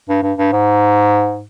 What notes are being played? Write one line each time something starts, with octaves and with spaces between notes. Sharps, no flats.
G2
G2
G2
G#2